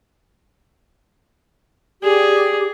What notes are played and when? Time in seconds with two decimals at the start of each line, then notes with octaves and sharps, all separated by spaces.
2.03 G4 G#4 D5